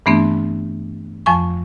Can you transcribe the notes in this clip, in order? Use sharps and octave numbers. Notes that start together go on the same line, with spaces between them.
G2 E3 A3 B3 C4 D4
F2 F3 G#5 C#6